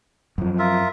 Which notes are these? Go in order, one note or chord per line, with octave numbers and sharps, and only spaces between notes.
F#2 F3
F4 A#4 E5